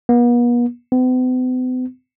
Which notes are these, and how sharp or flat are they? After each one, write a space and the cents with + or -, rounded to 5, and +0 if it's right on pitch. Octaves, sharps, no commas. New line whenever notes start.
B3 -45
B3 +45